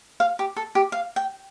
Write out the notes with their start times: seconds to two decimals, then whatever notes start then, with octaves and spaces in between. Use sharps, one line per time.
0.20 F5
0.39 G4
0.56 A4
0.75 G4
0.92 F5
1.16 G5